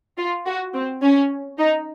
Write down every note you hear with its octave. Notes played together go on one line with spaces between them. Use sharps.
F4
F#4
C4
C#4
D#4